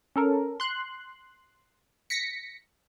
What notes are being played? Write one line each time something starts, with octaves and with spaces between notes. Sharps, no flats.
C#4 A4 A#4
C6 F#6
A#6 B6 C#7